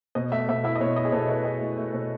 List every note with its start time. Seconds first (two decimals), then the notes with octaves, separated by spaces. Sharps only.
0.15 B2 D#5
0.32 A3 E5
0.49 B2 E5
0.64 E4 E5
0.76 D#5
0.81 B2 C#5
0.96 E4 D#5
1.05 G#4
1.12 B2 A4
1.28 E4 B4
1.44 E4 G#4
1.61 A3
1.78 A3
1.93 B2